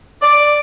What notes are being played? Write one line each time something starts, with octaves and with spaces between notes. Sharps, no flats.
D5